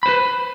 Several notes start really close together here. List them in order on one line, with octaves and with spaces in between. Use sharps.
B5 C5 B4